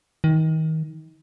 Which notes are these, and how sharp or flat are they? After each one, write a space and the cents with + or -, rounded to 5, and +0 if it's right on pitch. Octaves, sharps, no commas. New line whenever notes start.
D#3 +30